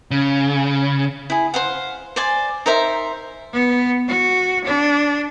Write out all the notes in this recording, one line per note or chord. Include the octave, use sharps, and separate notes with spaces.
C#3
E4 G#4
C5 F5 F#5
C5 D5 G#5
D#4 A#4 C5 E5
B3
F#4
D4